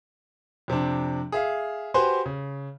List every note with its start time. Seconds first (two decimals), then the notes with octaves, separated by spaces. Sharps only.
0.68 F2 C3 C4 D4
1.32 G#4 E5 F5
1.94 F#4 G4 B4 C5 G#5 C6
2.26 C#3